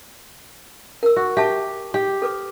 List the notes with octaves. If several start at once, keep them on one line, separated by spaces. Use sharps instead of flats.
A#4 E6
F#4
G4 E5 A5 C#6
G4
A4 B4 D6